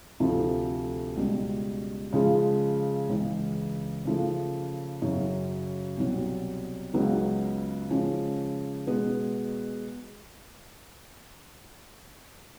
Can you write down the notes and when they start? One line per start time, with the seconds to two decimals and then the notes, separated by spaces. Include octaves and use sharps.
0.20 D2 C3 F3 A3
1.17 C#2 B2 G3
2.13 C#3 F3 G#3
3.09 C#2 C#3 E3
4.05 C#3 F3 A3
5.02 F#2 C#3 F#3
5.98 C2 B2 F#3
6.94 C#2 C#3 F#3 B3
7.90 C#3 F3 G#3 C#4
8.87 B2 G#3 B3